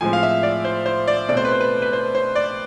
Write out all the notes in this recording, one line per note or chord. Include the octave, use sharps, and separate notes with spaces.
A2 F3 G#3 C4 G#5
F5
E5
D5
C5
C5
D5
B2 A3 C4 D5
C5
B4
C5
B4
B4
C5
C5
D5